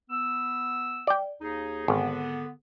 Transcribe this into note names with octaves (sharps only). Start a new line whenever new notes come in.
B3 E6
D5 G5
D#2 D#4 G#4
G#1 D3 B3